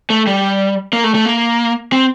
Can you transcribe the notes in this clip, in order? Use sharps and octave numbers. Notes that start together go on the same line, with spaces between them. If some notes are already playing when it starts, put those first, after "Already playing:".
A3
G3
A#3
A3
A3
A#3
C4